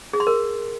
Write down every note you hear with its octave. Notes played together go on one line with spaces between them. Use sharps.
G#4
C6
A#4